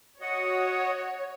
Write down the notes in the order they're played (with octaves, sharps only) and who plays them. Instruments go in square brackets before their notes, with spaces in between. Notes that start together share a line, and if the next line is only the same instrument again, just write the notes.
[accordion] F#4 D#5 F#5 [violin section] C#5